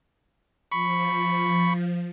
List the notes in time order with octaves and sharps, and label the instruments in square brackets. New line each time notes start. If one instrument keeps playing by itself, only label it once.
[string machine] F3 [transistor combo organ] B5 C#6